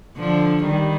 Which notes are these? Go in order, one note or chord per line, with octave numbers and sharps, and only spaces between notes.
D3 F3
D#3 G3